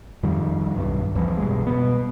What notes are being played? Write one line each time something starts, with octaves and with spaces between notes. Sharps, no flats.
F2 D#3 G3
B1 G2
C2 F2 E3 F3
B2 G3 G#3
B2 B3